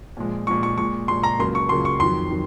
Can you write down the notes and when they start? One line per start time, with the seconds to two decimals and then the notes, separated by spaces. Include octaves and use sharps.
0.17 A#2 F3 G#3
0.47 A#2 F3 G#3 C#6
0.63 C#6
0.78 A#2 G#3 C#6
1.08 G#3 C6
1.12 A#2
1.23 A#5
1.39 C#2 C#3 F#3 A#3 C6
1.55 C#6
1.69 C#2 C#3 F#3 A#3 C6
1.85 C#6
2.00 F2 D#3 F#3 C6
2.31 D#3 F#3